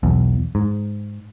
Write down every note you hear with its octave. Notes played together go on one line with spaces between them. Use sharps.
B1 E2
G#2